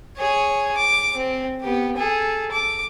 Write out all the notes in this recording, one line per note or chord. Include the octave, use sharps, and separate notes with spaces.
G#4 C#5
D6
C4
B3 G4
G#4 A4
D6